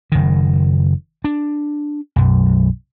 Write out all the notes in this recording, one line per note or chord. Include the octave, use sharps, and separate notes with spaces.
F#1 D#3
D4
B1 F#2